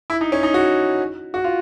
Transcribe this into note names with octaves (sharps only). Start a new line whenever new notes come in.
E4
D#4
C#4
D#4
F#4
F#4
F4